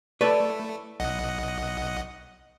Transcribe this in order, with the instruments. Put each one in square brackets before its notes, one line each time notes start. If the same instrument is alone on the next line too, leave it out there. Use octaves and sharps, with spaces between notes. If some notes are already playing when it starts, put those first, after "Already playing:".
[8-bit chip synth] A3 [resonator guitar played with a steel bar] E4 A4 D5 [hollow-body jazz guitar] B4 C#5
[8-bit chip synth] B1 D#5 F#5